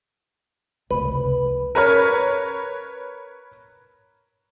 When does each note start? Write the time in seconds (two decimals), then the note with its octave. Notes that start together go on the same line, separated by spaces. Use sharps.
0.91 F1 C#2 B4
1.75 A#4 B4 C#5 F6